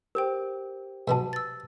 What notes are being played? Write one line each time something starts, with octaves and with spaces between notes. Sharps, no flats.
G4 A#4 C5 G5
G#2 B2 F#3 B4 A5
E6 A6